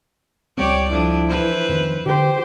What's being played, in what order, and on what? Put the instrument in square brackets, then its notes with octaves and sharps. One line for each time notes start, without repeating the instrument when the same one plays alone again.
[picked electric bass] C#2 G3 C4 [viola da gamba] G4 C#5 D5
[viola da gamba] F2 D4 [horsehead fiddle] E4
[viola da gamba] E3 B4 C5
[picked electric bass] F2 D#3
[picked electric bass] D3 [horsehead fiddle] G4 C5